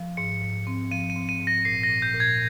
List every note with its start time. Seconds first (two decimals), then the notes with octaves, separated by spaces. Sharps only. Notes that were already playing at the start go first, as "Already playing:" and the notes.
Already playing: F3
0.17 G#2 C#7
0.42 G#2
0.67 C4
0.91 F3 D#7
1.10 D#7
1.16 C4
1.29 D#7
1.40 G#2
1.47 A#6
1.65 A#2 C7
1.83 A#6
1.89 A#2
2.02 G6
2.14 A#2
2.20 G#6